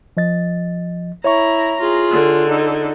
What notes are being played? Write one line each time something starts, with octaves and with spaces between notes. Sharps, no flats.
F3 D#5 A6
E4 C#5 E5 A#5 C#6
F4 G#4
D3
D#4